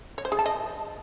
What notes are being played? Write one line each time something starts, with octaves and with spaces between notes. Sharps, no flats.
C#5
C5
G#4
A5
D#5